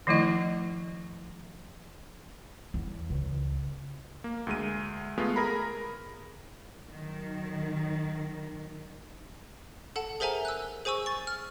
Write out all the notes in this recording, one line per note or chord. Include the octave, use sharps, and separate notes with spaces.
D#3 F3 A3 E4 D#5
E2
C#2
A#3
D2 G#3 D#7
G#3 A3 B3 F4
G#4 A#4 A#5 B5
D#3 F#3
A4 F#5 A5
G#4 A#4 C5 E5 G#5 A#5
E6 F#6
G#4 C5 G#5 C#6 E6
C#6 A6
F6